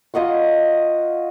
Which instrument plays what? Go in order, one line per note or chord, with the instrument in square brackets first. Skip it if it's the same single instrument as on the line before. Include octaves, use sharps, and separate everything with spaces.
[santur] F4 D#5 F#5 C#6